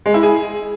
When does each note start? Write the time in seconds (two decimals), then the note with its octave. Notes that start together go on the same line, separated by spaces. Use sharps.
0.06 G#3
0.14 E4
0.23 G#4